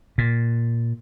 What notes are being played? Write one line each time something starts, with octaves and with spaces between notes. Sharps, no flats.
A#2